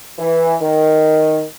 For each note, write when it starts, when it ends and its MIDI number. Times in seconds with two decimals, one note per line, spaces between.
0.19 0.55 52
0.62 1.42 51